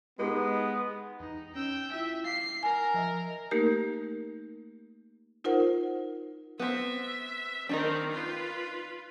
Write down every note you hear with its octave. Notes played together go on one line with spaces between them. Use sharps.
G#3 B3 D#4 G4 B4
E2 D#4
C#4 G5 E6
E4 F4 E5 G5
F5 D6 C7
A#4 G#5
F3 D#5 E5
A3 A#3 D#4 G4 A#4
D#4 F4 A#4 C5 F#5
B3 C4 E5
D#3 C4 D4 D#4 A#4
F4 B4